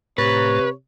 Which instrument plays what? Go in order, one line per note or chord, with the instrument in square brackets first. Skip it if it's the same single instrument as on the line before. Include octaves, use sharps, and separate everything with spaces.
[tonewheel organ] A2 A#5 A6 [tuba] C3 [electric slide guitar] B4 [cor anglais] C#5